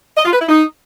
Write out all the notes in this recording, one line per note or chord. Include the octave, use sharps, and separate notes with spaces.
D#5
F4
B4
E4
D#4